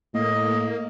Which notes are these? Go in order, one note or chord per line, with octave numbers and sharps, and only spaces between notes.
A2 A#3 D#5